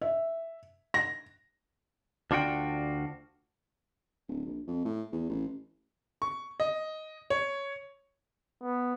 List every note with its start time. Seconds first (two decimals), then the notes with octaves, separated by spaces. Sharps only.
0.02 E5
0.94 A#6
2.31 D2 D4 F4 F#4 G5
4.29 D1
4.46 A#1
4.67 F2
4.85 A2
5.12 E2
5.29 A1
6.22 C#6
6.60 D#5
7.30 C#5
8.62 B3